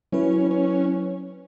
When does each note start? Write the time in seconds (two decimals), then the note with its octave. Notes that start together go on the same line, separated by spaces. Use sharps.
0.12 F#3 C#4 E4 B4
0.51 C#4